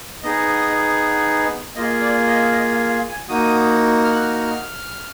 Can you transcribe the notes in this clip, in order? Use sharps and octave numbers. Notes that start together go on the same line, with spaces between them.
B3 D#4 G#4 D#5
A#3 F4 G#4 D#5
D5
D#5
D#5
F5
F5
G#5
A#3 D#4 F#4 D#6
F6
F#6
F6